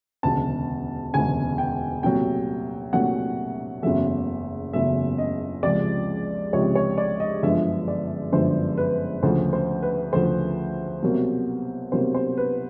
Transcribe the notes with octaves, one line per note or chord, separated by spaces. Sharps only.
E1 D2 C#3 A5
E1 D2 C#3 G#5
G5
C2 A#2 F#3 A3 G5
C2 A#2 F#3 A3 F#5
F#1 E2 C#3 F#3 A3 E5
F#1 E2 C#3 F#3 A3 E5
D#5
C#2 C3 F3 G#3 D5
C#2 C3 F3 G#3 C#5
C#5
D5
D#5
G1 F#2 D3 F3 G#3 E5
D5
G1 F#2 D3 F3 G#3 C5
B4
D2 C#3 F3 A3 C5
C5
B4
D2 C#3 F3 A3 C5
C2 B2 F#3 A#3
C2 B2 F#3 A#3 C5
C5
B4